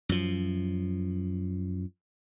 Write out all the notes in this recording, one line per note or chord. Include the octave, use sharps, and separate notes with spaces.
F#2 F3